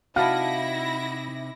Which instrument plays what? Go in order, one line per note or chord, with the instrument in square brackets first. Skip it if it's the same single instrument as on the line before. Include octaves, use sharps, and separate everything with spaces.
[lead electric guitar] C3 D#4 [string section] E4 A#6 [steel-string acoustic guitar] F#4 F#5 [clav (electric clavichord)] F5 A5